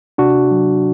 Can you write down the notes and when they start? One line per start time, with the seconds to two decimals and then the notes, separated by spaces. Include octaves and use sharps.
0.18 C3 D4 F#4
0.51 F#3